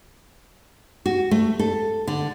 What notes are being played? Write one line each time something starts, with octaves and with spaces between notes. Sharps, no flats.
F#4
A3
A4
D3